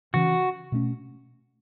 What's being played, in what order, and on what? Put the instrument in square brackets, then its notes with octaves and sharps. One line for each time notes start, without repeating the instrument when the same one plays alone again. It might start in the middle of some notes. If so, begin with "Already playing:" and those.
[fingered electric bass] C#3 E3 C#4 [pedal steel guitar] F#4
[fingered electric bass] B2 A3 C#4